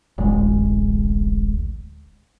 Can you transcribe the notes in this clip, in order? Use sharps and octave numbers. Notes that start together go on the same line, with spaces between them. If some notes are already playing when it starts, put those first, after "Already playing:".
D1 A1 G#3